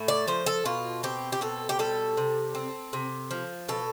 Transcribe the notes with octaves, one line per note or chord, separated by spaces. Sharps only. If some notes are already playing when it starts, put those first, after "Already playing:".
Already playing: A2 A3
D5
F3 C5
A4
B2 F4
C4 G4
G4
B2 A4
G4
G3 A4
C3
C4
C3
F3
B2 A4